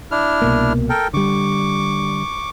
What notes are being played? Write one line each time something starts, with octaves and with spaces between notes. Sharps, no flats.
D4 E4 F6
C2 B2 A#3
A4 A#4 G5
D3 G3 C#6 D6